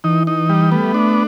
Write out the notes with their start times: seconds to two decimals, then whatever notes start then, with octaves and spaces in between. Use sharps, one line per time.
0.04 E3 D#4
0.27 D#4
0.49 G3
0.72 A3 B3
0.94 D4